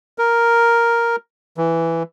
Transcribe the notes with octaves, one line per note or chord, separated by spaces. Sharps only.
A#4
E3